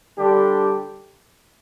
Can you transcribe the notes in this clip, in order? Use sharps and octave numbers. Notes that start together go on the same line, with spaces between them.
D3 G3 D4 G4